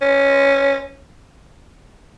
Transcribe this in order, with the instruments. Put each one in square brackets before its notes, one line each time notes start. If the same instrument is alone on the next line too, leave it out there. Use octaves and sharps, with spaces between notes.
[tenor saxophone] C#4